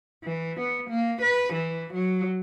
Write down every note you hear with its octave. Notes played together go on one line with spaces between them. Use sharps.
E3
B3
A#3
B4
E3
F#3